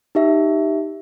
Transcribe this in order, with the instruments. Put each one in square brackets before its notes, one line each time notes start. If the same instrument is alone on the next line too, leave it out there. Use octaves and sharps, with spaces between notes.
[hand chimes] D#4 G4 E5